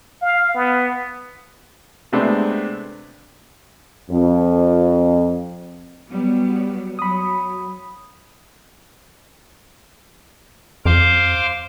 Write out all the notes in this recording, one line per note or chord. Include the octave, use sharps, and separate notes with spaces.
F5
B3
C3 G#3 A3 B3 C4 D4
F2
F#3 G3 B3
F#3 B5 D#6
F2 C5 F5 D6